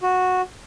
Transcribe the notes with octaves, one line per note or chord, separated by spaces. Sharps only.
F#4